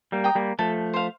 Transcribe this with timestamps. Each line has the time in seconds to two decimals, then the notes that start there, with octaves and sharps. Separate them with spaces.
0.12 G3 A#3
0.24 G5 A#5 D#6
0.35 G3 A#3
0.59 F3 A3 A4
0.94 C5 F5